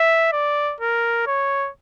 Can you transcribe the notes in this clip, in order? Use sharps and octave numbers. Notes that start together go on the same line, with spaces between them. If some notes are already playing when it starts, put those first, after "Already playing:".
Already playing: E5
D5
A#4
C#5